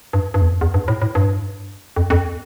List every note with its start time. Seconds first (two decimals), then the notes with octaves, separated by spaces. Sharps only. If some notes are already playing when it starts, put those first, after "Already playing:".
0.13 G2
0.34 G2
0.41 E2
0.48 F2
0.61 E2
0.74 G2
0.88 A2
1.02 A2
1.15 G2
1.96 F2
2.10 F2